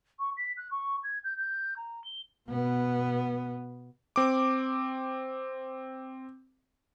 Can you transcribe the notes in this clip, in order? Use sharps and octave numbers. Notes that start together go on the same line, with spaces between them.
C#6
B6
F#6
C#6
G#6
G6
G6
A#5
G7
B2 B3
C4 D6